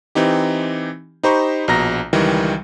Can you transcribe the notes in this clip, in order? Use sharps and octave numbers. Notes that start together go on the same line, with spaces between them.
E3 C4 D#4 G4
D#4 G4 C5 A#5 B5 C#6
A#1 B2 A#5 A#6
C#2 D#3 E3 G3